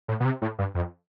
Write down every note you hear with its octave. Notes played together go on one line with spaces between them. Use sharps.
A2
B2
C3
A2
G2
F2